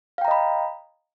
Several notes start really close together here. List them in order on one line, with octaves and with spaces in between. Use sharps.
F5 G5 A#5 D#5 B5